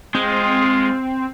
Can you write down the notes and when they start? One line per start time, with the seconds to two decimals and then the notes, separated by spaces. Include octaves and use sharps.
0.14 G#3 C4 F4